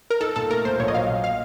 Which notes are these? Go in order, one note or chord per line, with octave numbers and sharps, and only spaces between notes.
A#4
D#4 A4
A#2 A4
A3 A#4
A#2 C5
A#1 C#5
D#5
F#3 F5
A#2
F5